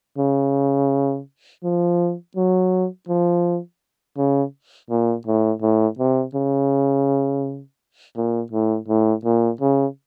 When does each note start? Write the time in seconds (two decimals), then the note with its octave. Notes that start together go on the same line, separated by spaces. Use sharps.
0.18 C#3
1.64 F3
2.37 F#3
3.09 F3
4.18 C#3
4.90 A#2
5.27 A2
5.62 A2
5.99 C3
6.35 C#3
8.17 A#2
8.52 A2
8.88 A2
9.25 A#2
9.61 C#3